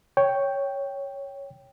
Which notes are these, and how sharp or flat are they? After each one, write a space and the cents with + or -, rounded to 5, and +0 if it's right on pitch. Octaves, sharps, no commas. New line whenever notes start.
C#5 +0 G5 +0